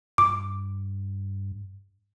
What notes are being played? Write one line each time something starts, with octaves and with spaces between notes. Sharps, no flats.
G2 D6